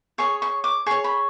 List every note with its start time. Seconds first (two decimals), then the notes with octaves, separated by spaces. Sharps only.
0.18 G#4 C#5 C#6
0.42 C#6
0.64 D6
0.86 G#4 C#5 C#6
1.04 B5